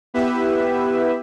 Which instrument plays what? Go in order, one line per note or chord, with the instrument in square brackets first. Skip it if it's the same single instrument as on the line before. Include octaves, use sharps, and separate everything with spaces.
[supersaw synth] B3 E4 G4 B4 E5